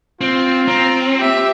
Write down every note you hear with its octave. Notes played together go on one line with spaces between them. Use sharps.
C4 F4
C4 A#5
G4 E5